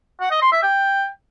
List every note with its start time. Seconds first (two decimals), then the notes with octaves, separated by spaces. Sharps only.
0.21 F#5
0.31 D#5
0.42 C6
0.52 E5
0.63 G5